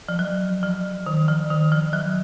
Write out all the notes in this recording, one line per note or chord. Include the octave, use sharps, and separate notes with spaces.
F3
F#3
F3
D#3
F3
D#3
F3
F#3